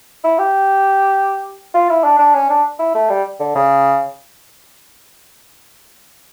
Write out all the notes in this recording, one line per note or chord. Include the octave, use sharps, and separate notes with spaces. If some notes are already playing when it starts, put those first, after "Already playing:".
E4
G4
F4
E4
D4
D4
C#4
D4
E4
A3
G3
D3
C#3